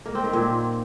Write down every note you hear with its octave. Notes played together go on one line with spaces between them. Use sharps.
A#3
C4
D#3
A#2